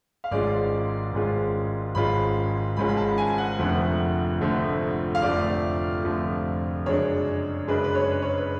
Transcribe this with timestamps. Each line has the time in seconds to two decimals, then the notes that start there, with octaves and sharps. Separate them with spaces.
0.24 F5
0.31 G#1 G#2 G#3 C#4 F4 D5
1.13 G#1 G#2 G#3 C#4 F4
1.95 G#1 G#2 G#3 C#4 F4 B5
2.77 G#1 G#2 G#3 C#4 F4 B5
2.89 B5
2.97 A5
3.18 G#5
3.38 F#5
3.59 F1 F2 D3 F3 A3
4.41 F1 F2 D3 F3 A3
5.15 F5
5.22 F1 F2 D3 F3 A3 D5
6.04 F1 F2 D3 F3 A3
6.86 F#2 C#3 G#3 D4 C#5
7.67 F#2 C#3 G#3 D4 B4
7.84 B4
7.95 C#5
8.11 B4
8.22 C#5
8.38 B4